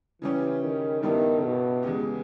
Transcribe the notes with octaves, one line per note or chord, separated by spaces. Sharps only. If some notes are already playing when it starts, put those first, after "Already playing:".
C#3 E3 G3 C#4 G4
D#3
G2 D#3 G3 B3 E4
B2
E2 C#3 G#3 B3 G4